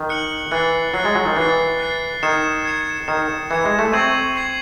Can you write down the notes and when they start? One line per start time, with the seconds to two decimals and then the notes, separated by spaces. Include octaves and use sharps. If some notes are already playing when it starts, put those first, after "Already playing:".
Already playing: D#3
0.09 F#6 C#7 F#7
0.51 E3 F#6 A6 C7
0.94 F#3 F#6 A6 C7
1.05 G#3
1.15 F#3
1.26 D#3
1.36 E3 F#6 A6 C7
1.79 F#6 A6 C7
2.23 D#3 G#6 C#7 E7
2.65 G#6 C#7 E7
3.08 D#3 G#6 C#7 E7
3.50 E3 G#6 C#7 E7
3.65 G#3
3.79 A3
3.93 C4 C#6 G#6 C7 F#7
4.36 C#6 G#6 C7 F#7